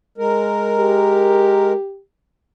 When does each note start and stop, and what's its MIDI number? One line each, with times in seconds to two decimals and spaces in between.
0.18 1.73 56
0.18 1.73 70
0.79 2.00 67